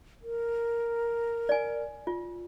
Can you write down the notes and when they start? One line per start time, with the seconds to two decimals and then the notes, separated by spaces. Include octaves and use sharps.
0.23 A#4
1.49 D5 G#5
2.07 F4